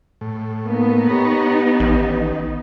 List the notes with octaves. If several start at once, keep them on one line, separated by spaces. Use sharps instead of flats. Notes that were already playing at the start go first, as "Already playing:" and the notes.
A2
A#3 B3 D#4
G4 B4 C#5 A#5
A1 D#3